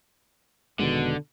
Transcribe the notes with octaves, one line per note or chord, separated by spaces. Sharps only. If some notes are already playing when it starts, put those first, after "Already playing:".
F1 B2 D3 D#3 G#3